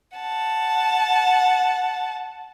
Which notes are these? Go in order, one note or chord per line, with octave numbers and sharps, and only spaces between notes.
F#5 A5